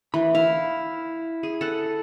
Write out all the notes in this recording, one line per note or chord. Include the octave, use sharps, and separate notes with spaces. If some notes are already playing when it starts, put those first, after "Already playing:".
E3 B5
E4 F5
G#4
A4 F#5